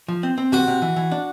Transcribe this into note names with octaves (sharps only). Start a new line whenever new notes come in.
F3
C4
C4
C3 F#4
C3
E3
E3
D4